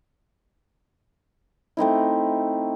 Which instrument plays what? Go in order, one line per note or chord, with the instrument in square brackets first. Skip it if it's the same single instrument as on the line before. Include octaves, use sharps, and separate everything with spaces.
[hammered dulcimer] A3 C4 D#4 E4